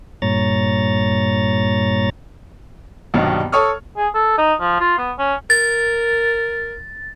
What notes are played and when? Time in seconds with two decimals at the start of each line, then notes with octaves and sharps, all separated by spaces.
0.22 G2 A#2 C#5 A#5 A6
3.14 A#1 G2 B2 D#3 F#3 G3
3.52 A4 C#5 C#6 D#6 F6
3.97 G#4
4.14 A4
4.38 D#4
4.60 F3
4.80 F4
4.98 B3
5.18 C#4
5.50 A#4 A6